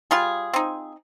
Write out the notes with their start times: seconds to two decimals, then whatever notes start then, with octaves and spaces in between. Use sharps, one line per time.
0.11 G3 F4 G#4
0.54 C4 D#4